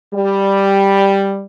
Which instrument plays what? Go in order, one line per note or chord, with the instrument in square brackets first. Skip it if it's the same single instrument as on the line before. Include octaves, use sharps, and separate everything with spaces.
[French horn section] G3